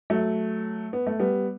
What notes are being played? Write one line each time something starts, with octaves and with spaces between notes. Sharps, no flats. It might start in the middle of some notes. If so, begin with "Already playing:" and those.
F#3 A3
B3
A3
G3 B3